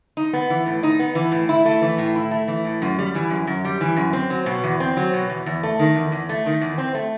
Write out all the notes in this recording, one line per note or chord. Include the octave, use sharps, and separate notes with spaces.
D#4
B3
E3
A2
D#4
B3
E3
A2
E4
A3
E3
A2
E4
A3
E3
A2
F#2
G3
E3
F#2
F#2
G3
E3
F#2
C4
F#3
B2
E2
C4
F#3
B2
E2
E2
A3
D#3
E2
E2
A3
D#3
E2
C4
A3